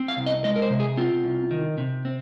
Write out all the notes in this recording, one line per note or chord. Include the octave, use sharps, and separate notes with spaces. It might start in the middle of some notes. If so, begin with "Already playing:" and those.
Already playing: C4
F5
C2
D#5
G#3 D#5
A#4
C5
C3
G#4
C4 F4
C2
D#3
C3
C4